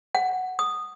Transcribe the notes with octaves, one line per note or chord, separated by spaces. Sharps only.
F#5
D#6